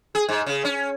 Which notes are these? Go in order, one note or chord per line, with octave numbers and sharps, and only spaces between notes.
G#4
G#2
C#3
C#4